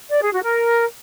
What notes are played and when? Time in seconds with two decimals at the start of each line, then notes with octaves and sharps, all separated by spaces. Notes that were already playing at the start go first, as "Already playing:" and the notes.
0.11 D5
0.21 G#4
0.32 F#4
0.43 A#4